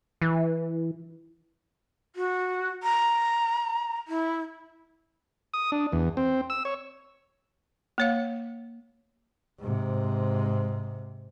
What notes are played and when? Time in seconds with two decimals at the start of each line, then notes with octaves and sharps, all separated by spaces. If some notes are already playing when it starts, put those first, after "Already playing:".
0.21 E3
2.16 F#4
2.83 A#5
4.08 E4
5.54 D#6
5.72 D4
5.92 E2
6.17 C4
6.50 E6
6.65 C#5
7.98 A#3 C#5 F5
9.60 G#2 C3